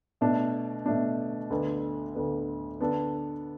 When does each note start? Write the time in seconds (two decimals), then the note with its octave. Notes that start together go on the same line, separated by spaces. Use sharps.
0.21 B2 A3 D4
0.86 B2 A3 D4
1.50 D2 D3 B3
2.15 D2 D3 B3
2.80 D3 B3 D4 A4